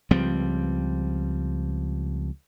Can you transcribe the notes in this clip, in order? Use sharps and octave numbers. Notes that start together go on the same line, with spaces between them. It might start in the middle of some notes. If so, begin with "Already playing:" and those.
C#2 F3 G3 C4